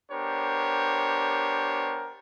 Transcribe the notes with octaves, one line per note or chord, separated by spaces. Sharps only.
B3 D4 G4 A#4 C5 C#5